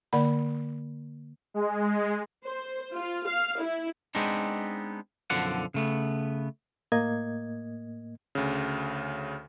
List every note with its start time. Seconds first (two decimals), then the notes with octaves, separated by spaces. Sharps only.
0.13 D3 A#3 D5 F#5 B5
1.54 G#3
2.45 C5
2.94 F4
3.28 F5
3.60 E4
4.15 G#3 B3 C4 D4 D#4
5.30 B1 F#2 D3 F3 D5 F#5
5.74 C#3 A3 B3
6.92 A2 A#3 D#5 G#6
8.35 D2 C#3